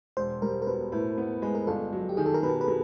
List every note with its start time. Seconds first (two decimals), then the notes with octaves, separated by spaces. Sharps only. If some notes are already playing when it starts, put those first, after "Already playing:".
0.17 E1 C5
0.42 G3 A#4
0.62 A#4
0.67 B2 B4
0.92 A2 B4
1.18 B3
1.42 G#3 B4
1.55 A#4
1.67 G1 A4
1.93 F#3
2.09 G4
2.17 D#3 G#4
2.26 A4
2.34 A#4
2.43 B2 B4
2.61 B4
2.68 B2